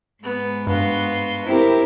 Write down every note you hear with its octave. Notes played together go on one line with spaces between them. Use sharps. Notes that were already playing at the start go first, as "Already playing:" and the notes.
G#2 B3
G2 B3 F#4 F5 C6
C4 E4 G4 A#4